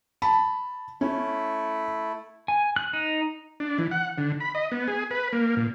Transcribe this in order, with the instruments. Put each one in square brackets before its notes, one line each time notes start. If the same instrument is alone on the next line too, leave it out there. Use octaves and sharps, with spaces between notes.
[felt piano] A5 B5
[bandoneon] A3 E4 [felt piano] C#4
[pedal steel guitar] G#5
F#6
D#4
[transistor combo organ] D4
E3
F#5
D3
B5
D#5
B3
G#4
B4
A#3
A#2